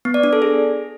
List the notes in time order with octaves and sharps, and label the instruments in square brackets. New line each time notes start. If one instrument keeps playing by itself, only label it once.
[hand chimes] B3
D5
D4
A4
G#4